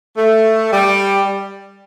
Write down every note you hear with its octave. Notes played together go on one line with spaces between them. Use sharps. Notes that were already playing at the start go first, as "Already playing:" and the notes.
A3
G3